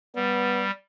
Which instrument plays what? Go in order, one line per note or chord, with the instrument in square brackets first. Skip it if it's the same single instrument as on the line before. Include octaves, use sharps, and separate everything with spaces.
[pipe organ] G3 [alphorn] B3